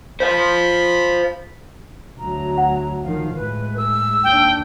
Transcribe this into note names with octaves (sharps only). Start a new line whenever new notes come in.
C5 F5 B5
D2 F#3 A#5
F#5
D#3 F3 F5
A2 G#3 B4
A#4 E6
D#2 D4 G5